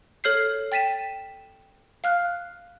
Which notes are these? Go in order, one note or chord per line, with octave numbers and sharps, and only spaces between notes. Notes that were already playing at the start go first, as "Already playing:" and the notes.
A4 C#5 F6 G6 C7
G5 A6 B6 D#7 E7
F5 F6 F#6